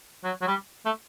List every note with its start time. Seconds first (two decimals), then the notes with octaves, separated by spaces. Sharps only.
0.24 F#3
0.42 F#3
0.48 G3
0.86 A3